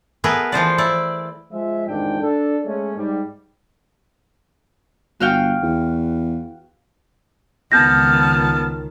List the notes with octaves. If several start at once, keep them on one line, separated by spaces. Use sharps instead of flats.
A3 B3 G#4 A#4 B4
E3 F3 C5 D5
E4 D5
F3 G#3 E5
A1 F2 G#2 D#3 D4 G5
D4 A4
G#3 A3 C#4
G#2 G3
G1 F#4 F5 G5
E2
C#2 D#3 B3 A5 F6 G6 A#6